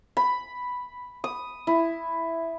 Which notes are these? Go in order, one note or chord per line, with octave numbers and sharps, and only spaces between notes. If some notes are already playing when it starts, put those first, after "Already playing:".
B5
D#6
E4